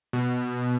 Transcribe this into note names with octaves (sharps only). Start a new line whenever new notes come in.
B2